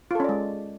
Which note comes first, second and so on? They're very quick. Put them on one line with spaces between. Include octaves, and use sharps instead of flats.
F4 A4 C#4 D5 G#3